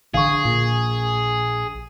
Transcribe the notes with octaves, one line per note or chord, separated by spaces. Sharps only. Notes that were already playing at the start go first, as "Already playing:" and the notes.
A#1 D3 D#3 G#4 F5 C#6
A#2